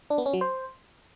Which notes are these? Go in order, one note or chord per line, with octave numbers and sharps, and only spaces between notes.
D4
B3
C#4
F#3
C5